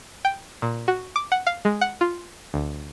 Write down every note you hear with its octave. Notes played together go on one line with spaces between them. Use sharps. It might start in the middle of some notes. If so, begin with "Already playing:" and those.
G5
A#2
F#4
D6
F#5
F5
G#3
F#5
F4
D2